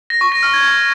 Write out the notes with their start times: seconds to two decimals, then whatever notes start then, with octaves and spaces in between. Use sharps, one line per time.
0.10 A#6
0.21 C#6
0.32 A#6
0.43 F6
0.53 G#6